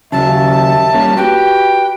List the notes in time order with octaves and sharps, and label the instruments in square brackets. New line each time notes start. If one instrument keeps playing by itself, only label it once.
[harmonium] D#2 E5 [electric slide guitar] C#3 F#3 [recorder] A5
[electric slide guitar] G3 A#3 C#4
[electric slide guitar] F#4 G4 [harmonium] B4 [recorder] G5